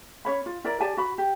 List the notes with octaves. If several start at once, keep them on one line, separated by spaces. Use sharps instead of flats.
C#4 C#5 B5
F4
E4 A#4 D5 A#5
G4 D5 G#5 A5
F#4 B5
G4